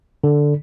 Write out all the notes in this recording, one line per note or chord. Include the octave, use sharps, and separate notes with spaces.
D3